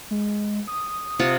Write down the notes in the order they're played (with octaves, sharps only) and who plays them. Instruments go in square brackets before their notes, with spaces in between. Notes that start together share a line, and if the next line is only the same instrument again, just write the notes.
[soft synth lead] G#3
D#6
[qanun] C3 F4 F#5